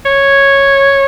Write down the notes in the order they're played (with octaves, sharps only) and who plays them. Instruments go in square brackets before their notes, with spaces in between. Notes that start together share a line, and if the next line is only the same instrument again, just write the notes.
[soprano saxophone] C#5